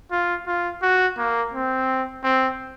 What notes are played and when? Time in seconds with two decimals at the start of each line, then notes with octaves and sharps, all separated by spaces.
0.11 F4
0.47 F4
0.82 F#4
1.17 A#3
1.53 C4
2.24 C4